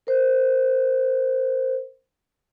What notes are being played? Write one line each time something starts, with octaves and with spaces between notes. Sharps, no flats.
A#4 C5